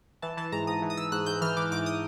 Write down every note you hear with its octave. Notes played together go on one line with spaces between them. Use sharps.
E3 A5
E3 A5
G#2 A#5
G#2 D#6
E3
D#6
E3 E6
G#2 F#6
G#2 G6
E3 F6
E3 D6
G#2 D6
D#6